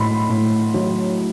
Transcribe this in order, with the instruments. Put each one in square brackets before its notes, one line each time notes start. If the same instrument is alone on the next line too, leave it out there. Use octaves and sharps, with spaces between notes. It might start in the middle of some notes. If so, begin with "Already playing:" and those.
Already playing: [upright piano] A2 F#3 B5 C6
A2
F#3